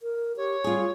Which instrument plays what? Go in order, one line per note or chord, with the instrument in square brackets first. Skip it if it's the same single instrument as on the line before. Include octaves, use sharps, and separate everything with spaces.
[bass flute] A#4
[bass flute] G4 [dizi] C#5
[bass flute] G3 [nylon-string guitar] F4 G#4